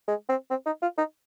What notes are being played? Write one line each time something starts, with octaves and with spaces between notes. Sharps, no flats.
G#3
C4
C4
D#4
F4
D#4